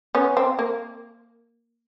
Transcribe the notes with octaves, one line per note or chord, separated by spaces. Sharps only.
B3 C#4
C4
A#3